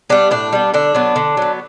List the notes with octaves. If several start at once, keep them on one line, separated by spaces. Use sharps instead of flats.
G3 B3 D4
A2 D4
G3 B3
D3 D4
F#3 B3
D3
F#3 B3